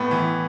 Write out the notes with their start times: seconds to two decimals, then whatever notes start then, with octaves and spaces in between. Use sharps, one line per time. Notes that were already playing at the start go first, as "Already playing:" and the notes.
Already playing: A2 B3
0.11 E3